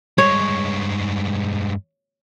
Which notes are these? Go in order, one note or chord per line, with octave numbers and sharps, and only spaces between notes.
G2 G#3 C#5